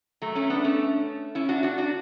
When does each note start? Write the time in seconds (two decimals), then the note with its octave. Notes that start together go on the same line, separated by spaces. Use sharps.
0.22 F#3 A3
0.35 A3 C#4
0.50 B3 D4
0.64 A3 C#4
1.35 C#4 E4
1.49 D4 F#4
1.63 D4 F#4
1.78 D4 F#4